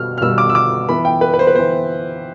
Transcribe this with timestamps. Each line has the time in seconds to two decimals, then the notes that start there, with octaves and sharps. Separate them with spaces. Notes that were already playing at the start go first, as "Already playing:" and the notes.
Already playing: B2 G3 B3 F6
0.18 F6
0.21 B2 G3 B3 E6
0.38 D6
0.49 E6
0.55 D6
0.89 E3 B3 B5
1.05 G5
1.21 B4
1.34 B4
1.39 C5
1.47 B4
1.55 E3 B3 C5